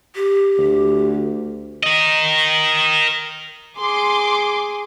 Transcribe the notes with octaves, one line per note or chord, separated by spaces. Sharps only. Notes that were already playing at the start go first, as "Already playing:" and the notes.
G4
D2
A#4 D#5
G#4 C6 D6